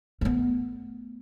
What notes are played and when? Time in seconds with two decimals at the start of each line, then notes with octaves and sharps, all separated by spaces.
0.21 A3 B3